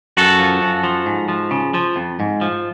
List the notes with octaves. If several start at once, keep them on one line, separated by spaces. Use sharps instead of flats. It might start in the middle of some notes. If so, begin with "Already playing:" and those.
F#2 F#4 A4
F3
F#2
F3
G#2
F3
C#3
F3
F2
G#2
F3